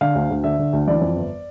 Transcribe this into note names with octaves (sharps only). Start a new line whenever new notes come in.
D3 F5
D2
D2
D3 E5
D3
D2
E3 D5
F2
G1